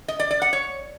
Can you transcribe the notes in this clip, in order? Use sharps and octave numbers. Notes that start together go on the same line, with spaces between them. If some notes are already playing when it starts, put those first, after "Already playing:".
D#5
D5
D5
F#5
C#5